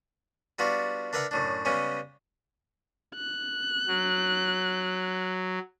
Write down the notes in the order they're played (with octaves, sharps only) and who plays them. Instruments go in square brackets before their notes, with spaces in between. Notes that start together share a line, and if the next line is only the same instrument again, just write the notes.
[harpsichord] G3 B3 D4 F4 F#4
D4 A#4 B4 E5 F#5 A#5
F#2 A2 D4
C#3 G3 G#3 B3 C#4
[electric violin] F#6
[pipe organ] F#3